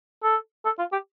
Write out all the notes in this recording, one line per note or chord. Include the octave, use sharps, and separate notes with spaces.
A4
A4
F4
G4